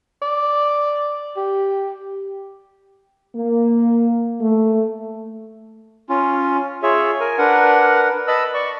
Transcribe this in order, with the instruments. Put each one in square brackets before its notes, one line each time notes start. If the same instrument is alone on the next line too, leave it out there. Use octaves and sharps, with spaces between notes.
[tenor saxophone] D5
G4
[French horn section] A#3
A3
[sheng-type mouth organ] C#4 F4
F4 G#4 C#5 E5
A#4 G#5
D4 A#4 B4 F#5
B4 D#5 A5 B5 E6
D5 C#6